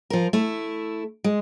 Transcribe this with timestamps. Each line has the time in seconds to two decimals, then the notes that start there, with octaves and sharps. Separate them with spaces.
0.10 F3 A#4
0.33 A3 E4
1.24 G#3